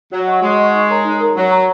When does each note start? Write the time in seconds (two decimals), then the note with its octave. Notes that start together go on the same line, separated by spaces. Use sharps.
0.12 F#3 F#4
0.27 D#5 F#5 C#6
0.42 G#3 F#4
0.58 D#5 F#5 C#6
0.74 D#4
0.89 A#4 C#5 A#5
1.05 D#4
1.20 A#4 C#5 A#5
1.36 F#3 C#5
1.51 A#5 C#6